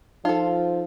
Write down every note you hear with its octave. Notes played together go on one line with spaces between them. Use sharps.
F3 D#4 F4 A4